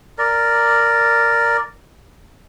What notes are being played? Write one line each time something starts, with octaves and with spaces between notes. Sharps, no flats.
A#4 D5